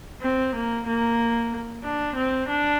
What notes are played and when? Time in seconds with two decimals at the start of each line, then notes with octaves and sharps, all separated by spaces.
0.22 C4
0.55 A#3
0.87 A#3
1.84 D4
2.16 C4
2.49 D4